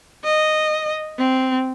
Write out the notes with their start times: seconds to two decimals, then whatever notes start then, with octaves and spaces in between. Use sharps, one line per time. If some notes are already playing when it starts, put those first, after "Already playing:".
0.25 D#5
1.18 C4